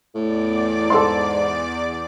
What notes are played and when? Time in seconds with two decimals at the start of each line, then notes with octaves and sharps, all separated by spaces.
0.15 E2 A2 D5 D6
0.90 G#2 A4 C6